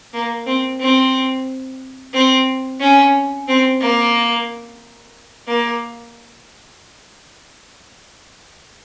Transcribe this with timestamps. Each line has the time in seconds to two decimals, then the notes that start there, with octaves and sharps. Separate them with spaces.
0.14 A#3
0.46 C4
0.80 C4
2.13 C4
2.80 C#4
3.48 C4
3.81 A#3
5.47 A#3